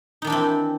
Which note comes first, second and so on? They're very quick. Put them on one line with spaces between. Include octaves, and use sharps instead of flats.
D#4 D#3 D4 E3 C4